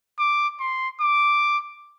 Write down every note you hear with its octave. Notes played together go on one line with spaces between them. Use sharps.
D6
C6
D6